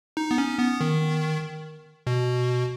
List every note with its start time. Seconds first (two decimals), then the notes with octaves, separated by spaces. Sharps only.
0.17 D#4
0.31 B3
0.38 C#4
0.59 B3
0.81 D#3
2.07 B2